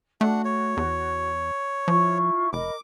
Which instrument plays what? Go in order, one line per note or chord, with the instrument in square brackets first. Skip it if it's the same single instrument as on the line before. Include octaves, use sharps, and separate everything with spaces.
[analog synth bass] A3 [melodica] D4 F#5 [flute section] F#4
[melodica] C#5
[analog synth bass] E2
[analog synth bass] F3 [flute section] E4 F4 C#6
[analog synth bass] F1 [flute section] A#4 D#5 B5 [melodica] D6